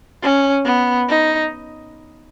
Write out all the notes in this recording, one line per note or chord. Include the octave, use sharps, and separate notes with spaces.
C#4
B3
D#4